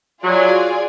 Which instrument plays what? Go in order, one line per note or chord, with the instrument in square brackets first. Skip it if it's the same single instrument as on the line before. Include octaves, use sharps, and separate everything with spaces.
[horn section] F#3 [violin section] F4 G#4 D5 G#5